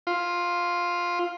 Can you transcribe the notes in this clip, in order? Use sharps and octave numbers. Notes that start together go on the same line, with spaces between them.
F4